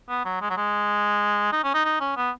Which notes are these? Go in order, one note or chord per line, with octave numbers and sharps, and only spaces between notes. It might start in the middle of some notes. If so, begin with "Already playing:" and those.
B3
F#3
G#3
F#3
G#3
D#4
C#4
D#4
D#4
C#4
B3